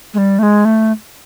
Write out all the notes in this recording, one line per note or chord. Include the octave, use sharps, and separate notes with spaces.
G#3
G3
A3
G#3
A3